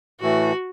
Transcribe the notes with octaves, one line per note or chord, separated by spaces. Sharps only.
A2 E3 A3 F#4